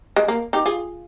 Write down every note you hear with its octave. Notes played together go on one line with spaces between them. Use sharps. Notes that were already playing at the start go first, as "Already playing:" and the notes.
G#3
A#3
D#4 G4
F4 G#4